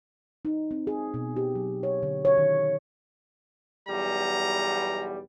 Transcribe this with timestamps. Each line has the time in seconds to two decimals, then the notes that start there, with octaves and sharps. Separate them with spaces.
0.45 D#4
0.71 C4
0.87 G#4
1.14 B2
1.37 G4
1.55 F#3
1.83 C#5
2.03 D3
2.25 C#5
2.38 D#3
3.88 B1 E2 G3 A#5